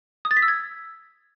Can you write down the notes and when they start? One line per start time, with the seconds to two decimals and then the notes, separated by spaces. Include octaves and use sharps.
0.25 D#6
0.31 A6
0.37 B6
0.42 E6
0.48 G#6